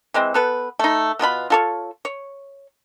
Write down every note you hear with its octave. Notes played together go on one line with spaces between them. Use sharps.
E3 G#3 C4
B3 A4 B4
A3 D#4
B2 B3 F4 B5
F4 A4 C#5
C#5